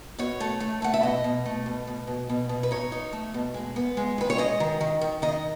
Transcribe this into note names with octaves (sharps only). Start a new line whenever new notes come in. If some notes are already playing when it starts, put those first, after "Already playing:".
B2 C#5
A3
A3
A3 F#5
E5
B2 D#5
B2
A3
B2
B2
B2
B2
B2
B4
D#4 C#5
D#4
A3
B2
G#3
B3
G#3
D#3 B4
C#5
G#3 D#5
D#3
D#3
D#3
D#3 D#5